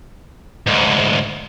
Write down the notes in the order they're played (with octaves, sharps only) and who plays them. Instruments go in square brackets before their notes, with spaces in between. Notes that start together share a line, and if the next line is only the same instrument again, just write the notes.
[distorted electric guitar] D2 G#2